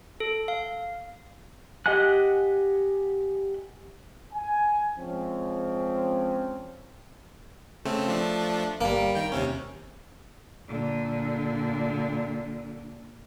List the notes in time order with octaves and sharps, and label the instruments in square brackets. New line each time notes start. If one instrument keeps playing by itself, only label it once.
[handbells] A4
F5
[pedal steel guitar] G4 D#5 F#5 G#5 F#6
[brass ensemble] G#5
F3 G#3 C4 C#4
[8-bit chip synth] C#3 A3 C4
F3 A3 D4
[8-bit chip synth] G1 G3 [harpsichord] A#3
[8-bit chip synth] D#3 G5
D#2 C3 C#4
[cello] A#2 D3